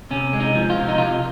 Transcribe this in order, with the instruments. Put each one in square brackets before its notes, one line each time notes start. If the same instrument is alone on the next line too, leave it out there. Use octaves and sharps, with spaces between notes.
[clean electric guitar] C3 C#4
G#3
D#4
F3
F4
C3
D#4
C3 F4